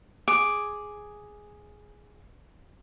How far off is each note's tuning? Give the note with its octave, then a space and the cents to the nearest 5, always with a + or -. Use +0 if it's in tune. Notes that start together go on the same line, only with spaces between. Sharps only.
G#4 +0 D6 +0